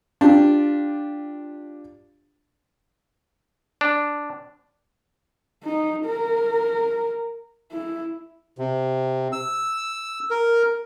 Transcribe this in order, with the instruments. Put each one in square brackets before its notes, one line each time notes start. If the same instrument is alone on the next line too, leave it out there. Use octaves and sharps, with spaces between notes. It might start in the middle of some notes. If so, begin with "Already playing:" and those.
[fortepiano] D4 F4 G4
[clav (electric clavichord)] D4
[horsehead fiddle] D#4
A#4
E4
[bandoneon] C3
E6
A#4